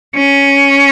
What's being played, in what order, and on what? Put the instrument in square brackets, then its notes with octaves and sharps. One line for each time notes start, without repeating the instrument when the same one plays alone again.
[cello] C#4